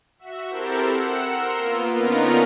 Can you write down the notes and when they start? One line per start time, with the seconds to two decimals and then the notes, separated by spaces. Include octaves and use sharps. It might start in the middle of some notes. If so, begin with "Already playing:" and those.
0.19 F#4 E5
0.50 C4 E4 G4 A4 A#4 C5
0.85 F#5 E6 C#7
1.25 A#4 C6 E6
1.57 A#3 B3 F4
1.93 D3 B3 C#4 D#4 F4 A#4